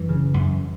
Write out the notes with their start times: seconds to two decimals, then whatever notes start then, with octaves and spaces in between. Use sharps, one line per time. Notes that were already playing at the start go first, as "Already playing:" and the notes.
Already playing: F#2 E3
0.09 C#3
0.34 F#2